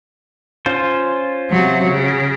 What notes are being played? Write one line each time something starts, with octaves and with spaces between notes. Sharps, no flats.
C#4 F4 C5
C3 F#3
C#3